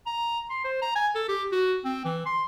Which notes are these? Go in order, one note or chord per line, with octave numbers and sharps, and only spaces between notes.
A#5
C6
C5
A#5
G#5
A4
G4
F#4
C4
E3
C6